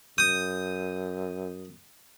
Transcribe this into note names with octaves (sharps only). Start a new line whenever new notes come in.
F#2 D#6 G6